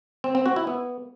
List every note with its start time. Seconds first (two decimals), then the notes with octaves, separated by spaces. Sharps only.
0.24 C4
0.35 C4
0.46 F#4
0.56 E4
0.67 B3